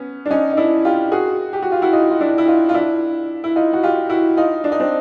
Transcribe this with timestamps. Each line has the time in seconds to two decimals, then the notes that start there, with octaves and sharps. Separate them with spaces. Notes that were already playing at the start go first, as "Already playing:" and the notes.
Already playing: B3 C#4
0.26 D4
0.31 C#4 D#4
0.53 D#4
0.57 D4 E4
0.85 F4 G4
1.12 F#4 G#4
1.53 G4
1.62 F#4
1.72 F4
1.82 E4 F#4
1.93 D#4 F4
2.10 F4
2.21 D4 E4
2.38 E4
2.47 D#4 F4
2.69 F4
2.74 D4 E4
3.44 E4
3.56 D#4 F4
3.73 F#4
3.83 F4 G4
4.09 E4 F#4
4.37 D#4 F4
4.64 D4
4.72 D#4
4.80 C4 D4